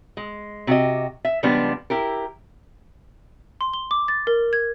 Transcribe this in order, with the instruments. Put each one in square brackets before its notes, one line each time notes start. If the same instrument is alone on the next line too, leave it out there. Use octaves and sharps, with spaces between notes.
[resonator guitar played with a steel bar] G#3
C3 F#4 G4 D#5
E5
C#3 F3 G3 G#3 B3 D4
E4 G4 A#4
[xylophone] C6
G7
D6
A6
A#4
G#6